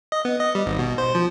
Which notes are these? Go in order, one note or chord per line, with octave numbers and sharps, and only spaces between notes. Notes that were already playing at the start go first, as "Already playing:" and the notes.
D#5
B3
D#5
G3
G#1
B2
C5
F3